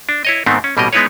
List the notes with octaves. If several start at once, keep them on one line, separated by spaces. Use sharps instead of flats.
D4
E4 C#5 D#5
G#2 D#3 A3 B3 C4
C#4
A1 B2 G3 A#3 A#4 D#5
G#3 B3 D#4 E4 B4 C#5